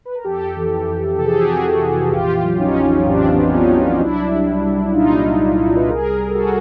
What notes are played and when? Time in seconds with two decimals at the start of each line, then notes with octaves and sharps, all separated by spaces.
0.05 B4
0.15 A#4
0.24 F2 G4 A4
0.56 E3
0.87 F2
1.19 C3 A4
1.26 G#4
1.34 G4
1.41 F#4 G#4
1.49 F2
1.81 E3
2.12 A#1 F4 G4
2.44 F#3
2.59 C#4 D#4
2.75 A#1
3.06 A2 C4 D4
3.30 B3 C#4
3.38 A#1
3.53 C#4 D#4
3.69 F#3
3.76 C#4 D#4
4.00 C2 D4 E4
4.31 G3
4.62 C2
4.93 A#2 D#4 F4
5.25 C2
5.57 G3
5.76 B4
5.87 C2 G#4 A#4
6.19 G3
6.29 A4
6.34 F#4 G#4